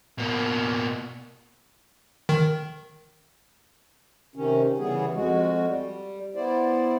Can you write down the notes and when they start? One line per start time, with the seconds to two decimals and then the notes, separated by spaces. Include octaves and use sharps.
0.18 B2 A#3
2.29 D#3
4.36 C3 D#3 C#4
4.78 C#3 E3 G3 B3 G#4
5.14 F2 G#3 F#4
5.66 G3
6.35 B3 E4 C5 D5